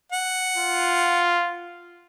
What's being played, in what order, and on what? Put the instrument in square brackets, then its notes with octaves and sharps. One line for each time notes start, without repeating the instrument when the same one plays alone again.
[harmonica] F#5
[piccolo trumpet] F4